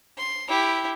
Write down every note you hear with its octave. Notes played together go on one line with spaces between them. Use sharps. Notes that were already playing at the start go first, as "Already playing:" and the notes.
C6
E4 G4